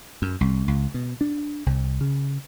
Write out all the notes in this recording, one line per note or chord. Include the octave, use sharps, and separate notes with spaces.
F#2
C2
C#2
B2
D4
C2
C#3